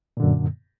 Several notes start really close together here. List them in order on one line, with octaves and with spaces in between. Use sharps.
A#2 D3 F#2